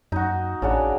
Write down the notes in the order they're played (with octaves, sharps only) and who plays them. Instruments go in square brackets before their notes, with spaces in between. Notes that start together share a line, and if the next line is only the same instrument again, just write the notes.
[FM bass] F#2 [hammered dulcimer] D#4 F#4
[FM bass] A1 [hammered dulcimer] C#3 D4 F#4